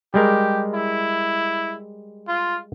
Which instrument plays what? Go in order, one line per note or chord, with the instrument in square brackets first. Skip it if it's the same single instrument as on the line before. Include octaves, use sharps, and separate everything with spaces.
[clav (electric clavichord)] G3 G#3 A#4 [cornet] G4
[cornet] E4
F4